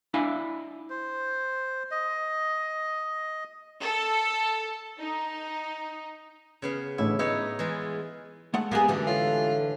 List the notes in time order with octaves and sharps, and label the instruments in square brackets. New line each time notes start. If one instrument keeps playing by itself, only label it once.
[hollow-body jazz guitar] D4 E4 F5 G#5
[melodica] C5
D#5
[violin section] A4
D#4
[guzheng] C#3 B3 F5
[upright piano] A1 A2 D3 [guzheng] E4
[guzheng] B3 D#4 C#5 [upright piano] D#5 E6
[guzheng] E3 G#3 F4
[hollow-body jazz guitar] G#3 A3 F#5
[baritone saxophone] A#3 [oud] B3 G4 G#4
[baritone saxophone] F#2 [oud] D3 E3
[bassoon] A2 [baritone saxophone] F4